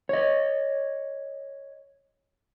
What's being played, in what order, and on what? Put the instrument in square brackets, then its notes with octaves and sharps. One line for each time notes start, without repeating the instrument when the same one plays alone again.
[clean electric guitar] C#5 D#5